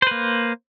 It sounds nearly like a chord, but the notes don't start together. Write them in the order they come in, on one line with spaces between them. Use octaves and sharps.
C5 B4 A#3